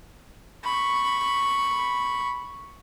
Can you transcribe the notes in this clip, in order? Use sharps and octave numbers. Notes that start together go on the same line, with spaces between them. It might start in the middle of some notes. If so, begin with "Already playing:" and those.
B5 C#6